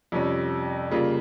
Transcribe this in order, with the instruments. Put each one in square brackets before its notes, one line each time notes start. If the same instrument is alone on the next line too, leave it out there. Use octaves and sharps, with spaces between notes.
[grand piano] F2 C3 G3 C#4
C#3 G3 A#3 F4